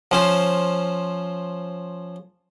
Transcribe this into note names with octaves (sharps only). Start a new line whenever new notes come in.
F3 C#4 C5